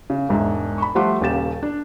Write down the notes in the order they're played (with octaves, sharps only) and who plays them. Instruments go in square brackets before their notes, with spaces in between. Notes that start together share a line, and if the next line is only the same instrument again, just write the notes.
[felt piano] C#3
E1 G#2 D4 E5
B5 C#6
F3 G3 A3 F#5 C6 D6
D#1 D#2 C#3 G4 A6 E7
D4